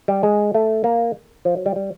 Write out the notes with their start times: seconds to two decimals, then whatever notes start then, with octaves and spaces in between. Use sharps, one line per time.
0.08 G3
0.23 G#3
0.54 A3
0.84 A#3
1.45 F3
1.56 F#3
1.66 G3
1.76 G3